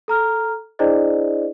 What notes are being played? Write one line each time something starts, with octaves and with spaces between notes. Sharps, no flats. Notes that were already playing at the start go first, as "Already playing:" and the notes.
A4 A#5 F6
D4 E4 G#4 C5 D5 D#5